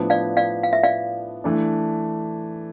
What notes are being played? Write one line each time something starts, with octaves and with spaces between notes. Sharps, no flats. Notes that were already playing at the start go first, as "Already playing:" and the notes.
Already playing: A2 F3 B3 D4
D5 F5
D5 F5
F5
E5
D5 F5
E3 A3 D4